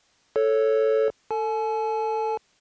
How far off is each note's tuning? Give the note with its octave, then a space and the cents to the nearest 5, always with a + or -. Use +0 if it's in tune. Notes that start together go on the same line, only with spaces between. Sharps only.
A4 +0 C#5 +0
A4 +25 G#5 +45